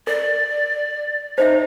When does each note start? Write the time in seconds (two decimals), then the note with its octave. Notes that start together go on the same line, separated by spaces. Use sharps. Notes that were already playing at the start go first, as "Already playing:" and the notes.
0.07 A#4 D5
1.38 D#4 C5 D#5 E5